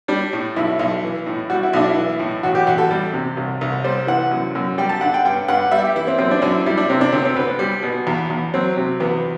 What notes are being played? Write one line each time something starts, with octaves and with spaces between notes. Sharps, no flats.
G3 D4
A2
B1 E4
B1
E3
A2
G3 F#4
E4
B1 D4
E4
E3
A2
A1 F#4
G4
A1 F#4
A4
G3
C3
C2
C2
G3 C5
E3 F#5
F#2
F#2
G3 G5
A5
D3 F#5
G5
G2 G5
G2 F#5
G3 E5
G4
E3 E4
C4
F#2 C4
D4
F#2 D4
E4
G3 E4
D4
C3 C4
D4
D2 C4
C4
D2 B4
G3
B2
E2
E2
F#3 C4
C3
E2 B3